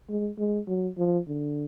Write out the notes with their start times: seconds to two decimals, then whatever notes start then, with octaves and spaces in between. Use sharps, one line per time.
0.09 G#3
0.39 G#3
0.68 F#3
0.98 F3
1.27 D3